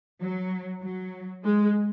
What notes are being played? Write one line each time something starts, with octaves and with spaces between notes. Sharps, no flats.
F#3
F#3
G#3